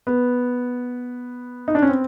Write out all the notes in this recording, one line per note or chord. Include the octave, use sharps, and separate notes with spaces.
B3
D#4
D4
C#4
C4